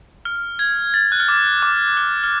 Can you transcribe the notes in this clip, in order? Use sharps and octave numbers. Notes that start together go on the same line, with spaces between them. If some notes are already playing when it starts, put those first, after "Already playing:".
F6
G#6
A6
F#6
F6
D6
D6
F6
F6